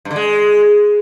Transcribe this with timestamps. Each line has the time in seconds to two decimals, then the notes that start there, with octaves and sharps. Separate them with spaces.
0.05 G2
0.11 D3
0.16 G#3